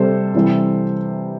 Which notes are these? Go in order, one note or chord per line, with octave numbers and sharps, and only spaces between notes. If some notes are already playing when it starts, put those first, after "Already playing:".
Already playing: C3 G3 A4 C5
C3 E3 G3